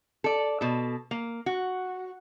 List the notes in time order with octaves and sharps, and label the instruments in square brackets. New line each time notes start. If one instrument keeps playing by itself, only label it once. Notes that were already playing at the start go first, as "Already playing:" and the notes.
[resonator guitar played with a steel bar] A4 D5
B2 A4
A#3
F#4